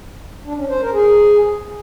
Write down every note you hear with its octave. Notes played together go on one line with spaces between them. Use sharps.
D4
C#4
C5
A#4
G#4